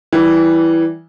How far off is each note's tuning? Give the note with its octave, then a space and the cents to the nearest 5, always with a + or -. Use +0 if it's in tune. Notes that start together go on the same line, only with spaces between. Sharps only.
E3 +0 G3 -20